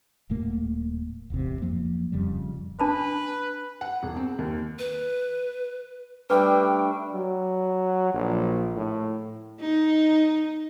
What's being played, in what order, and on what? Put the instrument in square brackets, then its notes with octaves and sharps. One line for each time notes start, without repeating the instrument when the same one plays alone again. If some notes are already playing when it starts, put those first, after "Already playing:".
[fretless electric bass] D#1 A2 A3 A#3
D1 G#1 E2 C3
F2 F3 F#3 A#3
D1 F2 C#3 G3
[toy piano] D4 A5 B5 [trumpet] B4
[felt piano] F#5
E1
C4
D#2
[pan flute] B4
[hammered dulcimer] G3 A3 D4 [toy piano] B4 [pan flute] G5
[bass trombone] F#3
A#1
A2
[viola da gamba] D#4